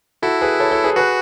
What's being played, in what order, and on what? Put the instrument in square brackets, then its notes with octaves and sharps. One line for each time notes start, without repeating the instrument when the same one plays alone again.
[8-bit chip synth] E4 [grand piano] F#4 A4
[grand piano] G#4 B4
A4 C#5
A4 C#5
G#4 B4
[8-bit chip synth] F#4 [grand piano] G#4 B4